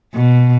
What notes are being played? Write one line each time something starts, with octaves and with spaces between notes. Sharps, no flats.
B2